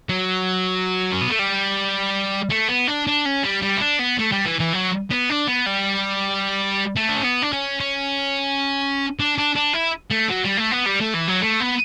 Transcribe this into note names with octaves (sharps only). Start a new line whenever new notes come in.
F#3
C#4
B3
A3
G3
A3
B3
D4
D4
C#4
G3
G3
E4
D4
B3
A3
G3
E3
E3
F#3
B3
D4
B3
G3
A3
D4
C#4
B3
D4
C#4
C#4
D4
D4
D4
E4
A3
F#3
G3
A3
B3
G3
A3
E3
F#3
A3
B3